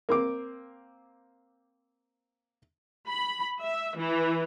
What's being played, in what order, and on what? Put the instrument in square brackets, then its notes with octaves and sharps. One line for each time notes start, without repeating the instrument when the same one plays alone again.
[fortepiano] A#3 C4 D6
[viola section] B5
E5
E3